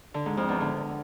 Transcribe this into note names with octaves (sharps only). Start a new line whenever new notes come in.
D3
G#2
F2
E2
D3